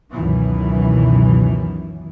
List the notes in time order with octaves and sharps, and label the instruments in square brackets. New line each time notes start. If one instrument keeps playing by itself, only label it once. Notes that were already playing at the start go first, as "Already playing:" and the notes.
[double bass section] C#2 F#2 B2 D#3 E3